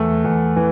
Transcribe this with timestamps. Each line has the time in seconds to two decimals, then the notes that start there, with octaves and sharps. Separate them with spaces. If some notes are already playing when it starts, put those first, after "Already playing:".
Already playing: E2 A3
0.24 E2
0.56 E3